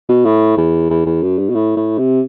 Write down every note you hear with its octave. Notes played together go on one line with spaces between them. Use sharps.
B2
A2
E2
E2
E2
F#2
G2
B2
A2
A2
C3